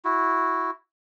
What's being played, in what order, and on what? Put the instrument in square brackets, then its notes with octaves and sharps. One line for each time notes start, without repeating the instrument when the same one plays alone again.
[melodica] E4 F#4